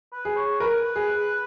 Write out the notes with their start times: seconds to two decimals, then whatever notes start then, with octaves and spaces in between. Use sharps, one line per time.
0.13 B4
0.25 G#4
0.36 C#5
0.60 A#4 B4
0.96 G#4